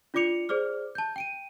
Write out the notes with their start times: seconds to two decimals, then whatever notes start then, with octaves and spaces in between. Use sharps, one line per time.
0.14 D4 F4 D5 D6 C#7 F7
0.49 G#4 C5 D5 D6 F6
0.95 A5 G6
1.16 G5 D7 D#7